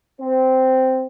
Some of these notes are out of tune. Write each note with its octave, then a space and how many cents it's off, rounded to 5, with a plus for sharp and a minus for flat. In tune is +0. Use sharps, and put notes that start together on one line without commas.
C4 -10